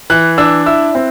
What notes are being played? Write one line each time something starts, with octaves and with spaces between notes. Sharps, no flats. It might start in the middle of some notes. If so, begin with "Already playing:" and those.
E3 F#6
D4 E6
E4 E6
C4